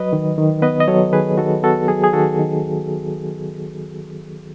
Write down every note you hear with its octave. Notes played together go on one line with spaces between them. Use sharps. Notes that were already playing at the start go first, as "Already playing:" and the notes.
Already playing: F#3 B4 D#5
D#3
D#3
B3 B4 D#5
D#5
F#3 A4 C#5
D#3 G#4 B4
D#3 F#4 A4
B3 F#4 A4
F#3 G#4
G#4
D#3 F#4 A4
D#3